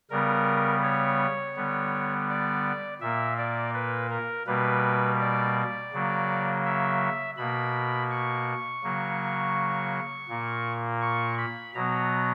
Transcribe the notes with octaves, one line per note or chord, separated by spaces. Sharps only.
C#3 G3 B3 A#4
C#5
D3 G3 B3
D5
A#2 A#3 E5
D5
B4
A#4
B2 G3 A#3 B4
D5
C#3 F#3 A#3
E5
B2 A#3 B5
C#6
C#3 F#3 A#3
A#2 A#3
C#6
B5
B2 F#3 B3 A#5